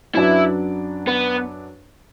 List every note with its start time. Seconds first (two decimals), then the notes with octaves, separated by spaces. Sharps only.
0.15 F#2 F#3 D4 E4 B4 D5
1.08 B3